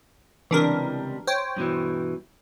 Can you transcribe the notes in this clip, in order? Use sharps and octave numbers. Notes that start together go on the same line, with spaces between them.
C#2 C3 E3 G3 D4 A#4
C5 C#5 G5
G2 B2 E3